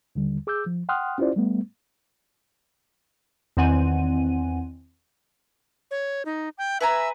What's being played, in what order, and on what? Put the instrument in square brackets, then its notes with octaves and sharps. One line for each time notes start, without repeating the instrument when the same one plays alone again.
[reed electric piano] D#2 D3 G3
G#4 D6 E6 G6
F3
F#5 G5 C6 D#6 F6 F#6
C#4 E4 F4 G4 C5 D5
G3 A3 B3
[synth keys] E2 D#3 C4 F#5 G#5 D#7
[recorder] C#5
D#4
G5
[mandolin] B4 G#5 A#5 [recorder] E5